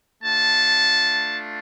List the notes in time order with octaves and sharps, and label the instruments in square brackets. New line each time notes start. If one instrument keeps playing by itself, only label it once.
[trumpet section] A3 D4 F4 A5